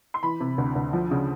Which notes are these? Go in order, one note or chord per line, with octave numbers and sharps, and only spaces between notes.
C6
E3 B5
C3
D2
D2
F3
C#3